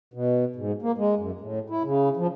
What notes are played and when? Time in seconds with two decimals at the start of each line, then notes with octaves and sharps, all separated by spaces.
0.14 B2
0.56 G#2
0.82 A#3
0.98 G#3
1.17 F#2
1.41 A2
1.70 E4
1.84 C#3
2.17 F3